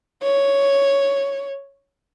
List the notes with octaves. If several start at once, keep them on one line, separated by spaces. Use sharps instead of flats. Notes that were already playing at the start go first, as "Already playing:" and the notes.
C#5